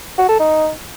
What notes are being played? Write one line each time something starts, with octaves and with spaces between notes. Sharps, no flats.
F#4
A4
D#4